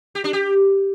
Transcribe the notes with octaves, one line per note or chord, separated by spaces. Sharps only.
G4
D4
G4